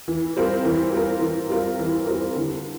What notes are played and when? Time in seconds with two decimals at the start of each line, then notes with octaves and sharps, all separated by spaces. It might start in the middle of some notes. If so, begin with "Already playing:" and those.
0.08 E3
0.37 G3 C4 F4 A#4
0.65 E3
0.92 G3 C4 F4 A#4
1.21 E3
1.50 G3 C4 F4 A#4
1.79 E3
2.07 G3 C4 F4 A#4
2.36 D3